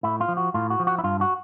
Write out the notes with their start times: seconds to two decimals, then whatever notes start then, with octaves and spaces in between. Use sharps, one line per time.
0.03 A2 E4
0.21 F4
0.28 F3
0.37 F#4
0.54 A2 F4
0.70 F#4
0.79 F3
0.87 F#4
0.98 E4
1.04 G2 F4
1.21 F#4